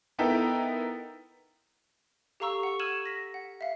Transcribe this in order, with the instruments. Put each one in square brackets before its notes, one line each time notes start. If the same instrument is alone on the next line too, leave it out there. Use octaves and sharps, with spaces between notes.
[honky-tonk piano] B3 D#4 E4 A4 A#4 G5
[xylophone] G4 A4 F5 A#5 C#6 E6
F#5 C#6
E6 F6 G#6 D#7 E7 F#7
A#6 B6
F#5
E5 F5